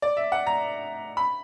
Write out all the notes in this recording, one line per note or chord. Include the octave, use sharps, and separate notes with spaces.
D5
E5
F#5
A#5
B5